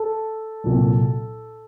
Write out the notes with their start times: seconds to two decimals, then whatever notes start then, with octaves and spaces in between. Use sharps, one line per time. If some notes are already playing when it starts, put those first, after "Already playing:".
Already playing: A4
0.64 C2 A#2 F#3